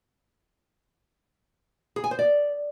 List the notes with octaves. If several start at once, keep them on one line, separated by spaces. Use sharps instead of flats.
G#4
G#5
C5
D5